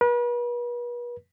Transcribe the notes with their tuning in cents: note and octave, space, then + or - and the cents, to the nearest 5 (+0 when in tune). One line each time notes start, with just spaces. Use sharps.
B4 -40